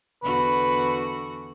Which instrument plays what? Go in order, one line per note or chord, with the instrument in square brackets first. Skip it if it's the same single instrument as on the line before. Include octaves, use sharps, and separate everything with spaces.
[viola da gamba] E2 D3 F#4 [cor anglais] B4